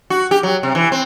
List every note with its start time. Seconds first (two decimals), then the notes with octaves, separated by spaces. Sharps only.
0.10 F#4
0.31 G4
0.43 F#3
0.63 C3
0.75 E3
0.92 C4